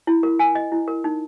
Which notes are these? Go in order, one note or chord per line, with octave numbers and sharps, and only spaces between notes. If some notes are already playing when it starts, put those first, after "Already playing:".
E4
A#4
G#5
D#5
E4
A#4
D#4